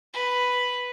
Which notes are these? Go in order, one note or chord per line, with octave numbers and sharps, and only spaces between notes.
B4